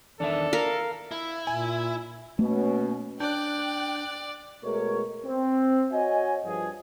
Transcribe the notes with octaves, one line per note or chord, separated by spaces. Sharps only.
E2 D#3 D4 A4 E5
A#4 F5
E4
A#2 G#5
B2 A3 A#3 C#4
D4 D5 G5 F#6 G6
B2 G#3 A3 A#4 C#5
C4
F#4 C#5 D#5 G#5
G2 F3 G#4